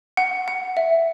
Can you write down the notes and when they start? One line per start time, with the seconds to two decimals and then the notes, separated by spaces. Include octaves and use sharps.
0.17 F#5
0.48 F#5
0.77 E5